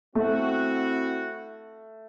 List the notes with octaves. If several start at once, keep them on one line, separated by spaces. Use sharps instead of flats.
A3 C4 E4 F#4